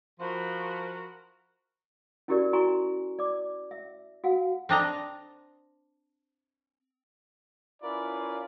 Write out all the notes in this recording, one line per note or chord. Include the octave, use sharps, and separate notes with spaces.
F3 F#4 A#4 B5 C6
C#4 E4 F#4 G4 A#4 D5
E4 F#4 G#5 A#5 C6 C#6
D5 D6
E5
F#4 F5 F#5
C4 D4 D#5 A#5
C#4 E4 F4 A#4 B4 D5